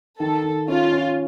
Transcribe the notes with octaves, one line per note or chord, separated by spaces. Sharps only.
D#3 A4
D#3
C#4 F4
C#4